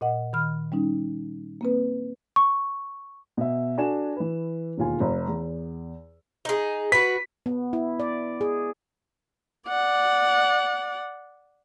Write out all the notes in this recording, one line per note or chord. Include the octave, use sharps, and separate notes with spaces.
A#2 D#5 F#5
D#3 B5 F6
G3 C#4 D#4
A#3 C4 B4
C#6
B2 E5
D4 F#4 A4 G#5 E7
E3 B4
E1 D#2 F4 G#5
F1
E2
D#4 G#4
F#4 B4 B6
B3
E4
D5
G#4
D5 F#5